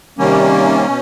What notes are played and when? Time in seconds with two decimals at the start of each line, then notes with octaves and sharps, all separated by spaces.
0.18 C3 D#3 G3 A#3 C#4
0.86 B2